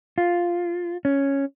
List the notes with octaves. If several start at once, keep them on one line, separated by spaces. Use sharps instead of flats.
F4
C#4